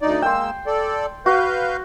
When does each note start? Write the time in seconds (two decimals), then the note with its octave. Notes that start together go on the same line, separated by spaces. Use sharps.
0.01 D2 D#4 D5
0.22 G#3 A#3 G5 C6 E6
0.67 A4 D5
1.26 F#4 B4 F5 G6